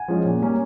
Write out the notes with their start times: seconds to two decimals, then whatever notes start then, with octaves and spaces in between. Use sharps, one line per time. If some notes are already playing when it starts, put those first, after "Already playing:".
Already playing: F#5 G#5
0.08 F3 G#3 C#4
0.25 A#2
0.41 G3 A#3 C#4